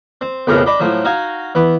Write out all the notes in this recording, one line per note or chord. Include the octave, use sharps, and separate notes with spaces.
C4
B1 F2 A2 C#3 B3 A#4
D4 D#5 B5 D6
A2 F3 F#3
D#4 F#4 F5 G#5 D#6
E3 B3